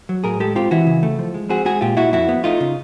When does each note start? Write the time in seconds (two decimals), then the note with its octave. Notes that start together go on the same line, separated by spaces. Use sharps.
0.09 F#3
0.24 A2 G#4 A#4
0.40 G#3 G4 A4
0.55 C4 F4 G4
0.71 E3 E4 F#4
0.87 C#3
1.03 A3
1.19 F3
1.34 G#3
1.49 C4 F#4 G#4
1.65 G#3 F#4 G#4
1.81 A#2 F4 G4
1.97 A#2 E4 F#4
2.13 F2 E4 F#4
2.29 B3
2.44 A3 D#4 F4
2.60 C#3